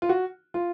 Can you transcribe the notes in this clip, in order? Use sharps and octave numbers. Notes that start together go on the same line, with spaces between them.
F4
F#4
F4